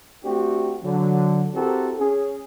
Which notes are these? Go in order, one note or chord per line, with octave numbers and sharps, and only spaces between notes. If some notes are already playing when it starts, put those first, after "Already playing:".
A3 C4 D4 F#4 G4
D3 F#3
C4 E4 F#4 G4 A4 A#4
C#4 G#4